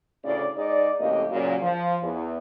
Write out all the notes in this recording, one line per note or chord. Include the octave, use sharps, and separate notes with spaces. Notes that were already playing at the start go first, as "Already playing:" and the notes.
D2 A2 C#3 D5
G#2 D#4 G#4 D5
F2 A2 C#3 A#3 G4 D#5
A#2 C#3 F#3
F3
E2